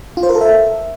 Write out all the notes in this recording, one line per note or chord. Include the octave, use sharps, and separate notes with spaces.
F4
C5
A#4
A4
E5